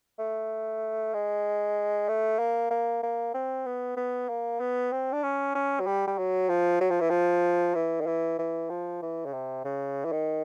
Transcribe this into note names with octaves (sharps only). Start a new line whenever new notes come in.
A3
G#3
A3
A#3
A#3
A#3
C4
B3
B3
A#3
B3
C4
D4
C#4
C#4
F#3
G3
G3
F#3
F3
F#3
F3
E3
F3
E3
D#3
E3
E3
F3
E3
C#3
C3
C#3
E3
D#3